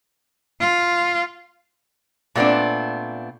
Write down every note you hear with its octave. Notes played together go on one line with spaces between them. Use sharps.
F4
A#2 A3 B3 C4 D4